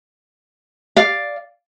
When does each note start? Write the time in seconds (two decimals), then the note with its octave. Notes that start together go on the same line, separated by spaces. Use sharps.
0.96 D5 F5